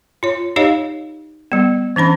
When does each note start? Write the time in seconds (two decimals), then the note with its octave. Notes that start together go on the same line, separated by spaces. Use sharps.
0.23 F4 C#5
0.56 D#4 G4 C#5 D#5 F5
1.52 G3 B3
1.96 E3 C#4 D4 B5